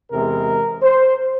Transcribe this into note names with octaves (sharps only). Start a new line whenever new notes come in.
E2 C3 E3 G#3 A#4
C5